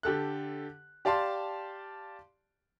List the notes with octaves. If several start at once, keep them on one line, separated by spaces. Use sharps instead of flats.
D3 G4 A4 F#6
G4 D5 F5 A5 C6